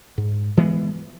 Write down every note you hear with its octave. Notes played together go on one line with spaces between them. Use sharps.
G#2
E3 G#3 B3